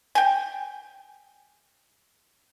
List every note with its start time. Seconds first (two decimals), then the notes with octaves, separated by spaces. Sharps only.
0.15 G5 G#5